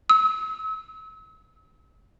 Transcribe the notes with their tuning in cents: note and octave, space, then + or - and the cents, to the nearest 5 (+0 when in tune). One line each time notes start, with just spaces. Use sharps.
E6 -40